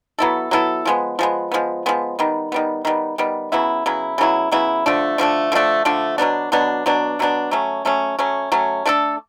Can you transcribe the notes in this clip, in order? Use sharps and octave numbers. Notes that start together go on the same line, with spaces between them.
F#3 B3 E4 A4
F#3 B3 E4 A4
F3 G#3 B3
F3 G#3 B3
F3 G#3 B3
F3 G#3 B3
D#3 G3 B3
D#3 G3 B3
D#3 G3 B3
D#3 G3 B3
C#3 F#3 B3 E4
C#3 F#3 B3 E4
C#3 F#3 B3 E4
C#3 F#3 B3 E4
D3 F3 A3 D4
D3 F3 A3 D4
D3 F3 A3 D4
D3 F3 A3 D4
B2 F#3 B3 D4
B2 F#3 B3 D4
B2 F#3 B3 D4
B2 F#3 B3 D4
F#3 A3 C#4
F#3 A3 C#4
F#3 A3 C#4
F#3 A3 C#4
A3 D4 F#4 A4